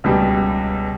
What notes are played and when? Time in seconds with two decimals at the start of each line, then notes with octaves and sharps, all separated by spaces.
0.04 C#2 B2 G3